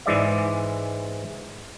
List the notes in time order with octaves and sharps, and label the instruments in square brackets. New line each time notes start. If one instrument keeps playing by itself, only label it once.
[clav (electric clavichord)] G#2 E3 G#3 D5 E5